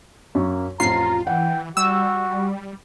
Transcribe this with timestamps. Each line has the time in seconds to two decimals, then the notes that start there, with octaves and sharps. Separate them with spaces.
0.35 F#2 A#3 C#6
0.80 A1 F2 F4 A#5 C7
1.27 E3 F#5 G5
1.77 G3 F#4 E6